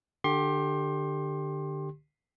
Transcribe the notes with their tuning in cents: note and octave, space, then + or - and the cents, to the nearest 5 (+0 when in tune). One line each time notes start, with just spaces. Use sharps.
D3 +20 G4 +0 C6 +30